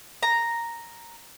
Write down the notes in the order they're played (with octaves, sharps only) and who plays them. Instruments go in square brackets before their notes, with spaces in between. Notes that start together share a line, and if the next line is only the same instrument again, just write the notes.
[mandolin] A#5